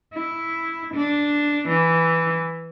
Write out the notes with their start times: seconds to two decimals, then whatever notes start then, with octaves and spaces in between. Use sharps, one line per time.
0.14 E4
0.94 D4
1.68 E3